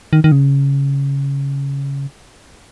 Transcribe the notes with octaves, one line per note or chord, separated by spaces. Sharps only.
D#3
D#3
C#3